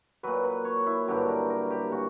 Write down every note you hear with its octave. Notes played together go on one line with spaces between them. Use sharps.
A#2 F#3 B4
B4
C#5
E4
G2 D3 F#3 G4
A#4
A#4
G4
A#2 F#4